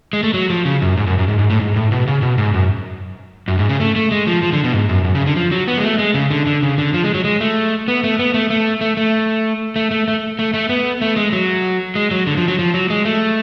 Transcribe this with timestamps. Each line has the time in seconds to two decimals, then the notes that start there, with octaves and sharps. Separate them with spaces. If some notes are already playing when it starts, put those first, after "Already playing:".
0.13 G#3
0.23 A3
0.34 F#3
0.50 F3
0.65 C#3
0.82 F#2
0.97 G#2
1.07 F#2
1.19 F#2
1.28 G#2
1.39 G#2
1.50 A2
1.60 G#2
1.76 A2
1.92 B2
2.07 C#3
2.22 B2
2.38 G#2
2.54 F#2
3.48 F#2
3.59 G#2
3.69 C#3
3.80 A3
3.96 A3
4.11 G#3
4.27 F3
4.43 F3
4.53 D3
4.64 B2
4.73 G#2
4.89 F#2
5.04 F#2
5.15 C#3
5.27 D3
5.36 F3
5.52 F#3
5.68 B3
5.77 G#3
5.83 A3
5.99 G#3
6.14 C#3
6.31 D3
6.47 D3
6.63 C#3
6.78 D3
6.94 F3
7.04 G#3
7.14 F#3
7.24 G#3
7.41 A3
7.88 B3
8.04 A3
8.19 B3
8.34 A3
8.50 A3
8.81 A3
8.97 A3
9.76 A3
9.91 A3
10.08 A3
10.39 A3
10.54 A3
10.69 B3
11.02 A3
11.16 G#3
11.32 F#3
11.95 G#3
12.11 F#3
12.27 D3
12.37 F3
12.48 F#3
12.59 F3
12.74 F#3
12.90 G#3
13.05 A3